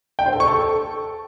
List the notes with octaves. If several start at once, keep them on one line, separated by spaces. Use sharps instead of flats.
G5
C5
A4
C#6
A4